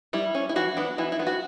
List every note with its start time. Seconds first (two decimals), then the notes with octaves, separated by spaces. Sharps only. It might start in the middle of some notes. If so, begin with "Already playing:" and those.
0.13 G3 E4
0.35 C#4
0.49 E4
0.56 E3 F#4
0.77 B3 D4
0.98 E3 E4
1.12 E4
1.19 B3 D4
1.27 F#4